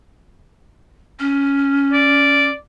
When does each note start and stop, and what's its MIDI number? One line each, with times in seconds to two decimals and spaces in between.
1.20 2.49 61
1.93 2.54 74